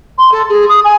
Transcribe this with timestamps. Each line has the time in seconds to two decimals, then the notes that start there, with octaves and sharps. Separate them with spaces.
0.18 C6
0.31 A4
0.49 G#4
0.68 D#6
0.84 G#5